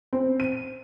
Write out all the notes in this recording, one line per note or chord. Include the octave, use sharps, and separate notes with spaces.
C4
D#7